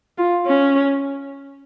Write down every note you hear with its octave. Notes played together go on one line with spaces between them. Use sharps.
F4
C#4